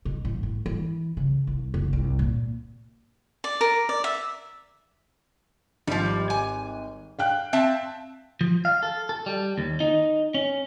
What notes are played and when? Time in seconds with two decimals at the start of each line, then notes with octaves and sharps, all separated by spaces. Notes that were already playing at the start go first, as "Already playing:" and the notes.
0.05 B2
0.25 A1
0.43 A2
0.66 E3
1.17 C#3
1.47 C2
1.74 F#1
1.93 C2
2.19 A#2
3.44 D5
3.61 A#4
3.89 D5
4.04 E5
5.87 G#1 F3 G3
6.30 G#5
7.19 F5 G5 F#6
7.53 C4 E5 A5
8.41 F3
8.65 F5
8.83 A4
9.09 A4
9.26 G3
9.58 D#2
9.80 D#4
10.34 C#4